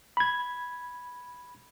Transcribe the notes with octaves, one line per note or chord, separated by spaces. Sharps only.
B5 G#6